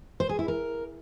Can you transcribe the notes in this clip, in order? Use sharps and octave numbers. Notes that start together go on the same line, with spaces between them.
C5
G#4
E4
A#4